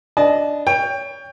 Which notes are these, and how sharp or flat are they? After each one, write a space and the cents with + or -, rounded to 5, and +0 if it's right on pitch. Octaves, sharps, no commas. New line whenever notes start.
D4 +0 D#5 +0 A5 -30
C#5 +20 G5 +20